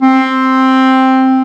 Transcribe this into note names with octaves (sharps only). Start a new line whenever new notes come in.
C4